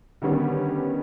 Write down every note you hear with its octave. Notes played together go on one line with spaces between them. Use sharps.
D3 D#3 G3 B3 C#4